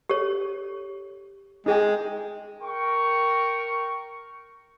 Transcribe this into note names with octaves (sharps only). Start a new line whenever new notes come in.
G4 A4 C#5
G#3 D#4 G#4 G5
A#4 G5 C#6